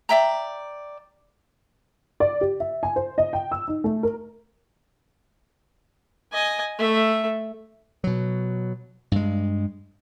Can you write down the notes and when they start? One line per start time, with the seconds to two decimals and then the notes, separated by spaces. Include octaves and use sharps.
0.09 D5 E5 G5 A#5
2.20 D5
2.41 G4
2.60 E5
2.83 G#5
2.96 C5
3.18 D#5
3.33 G5
3.52 E6
3.68 D#4
3.84 A3
4.03 A#4
6.33 D#5 G#5
6.78 A3 E5
8.04 B2 F#3
9.12 G2 G#3